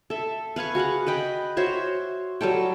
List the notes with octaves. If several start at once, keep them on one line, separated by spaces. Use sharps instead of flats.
A4 E5
B4 F5 G#5 C#6
F#4 G#4 F5 F#5
B4 D#5 G5 B5
F#4 C5 C#5 E5
F#3 G3 A4 G5